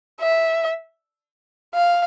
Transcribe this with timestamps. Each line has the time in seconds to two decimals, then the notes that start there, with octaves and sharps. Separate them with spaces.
0.20 E5
1.74 F5